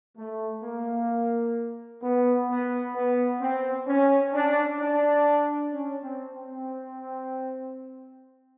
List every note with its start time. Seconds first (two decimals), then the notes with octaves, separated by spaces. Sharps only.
0.16 A3
0.63 A#3
2.02 B3
2.49 B3
2.94 B3
3.40 C4
3.87 C#4
4.33 D4
4.79 D4
5.71 C#4
6.02 C4
6.34 C4